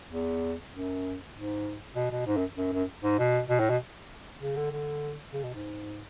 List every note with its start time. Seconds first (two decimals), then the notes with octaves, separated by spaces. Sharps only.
0.11 E2
0.73 F#2
1.35 G#2
1.96 B2
2.11 B2
2.27 G#2
2.37 F#2
2.57 F#2
2.73 F#2
3.03 G#2
3.19 B2
3.50 B2
3.60 A2
3.70 B2
4.42 C#3
4.56 D3
4.72 D3
5.34 C#3
5.43 B2
5.55 G#2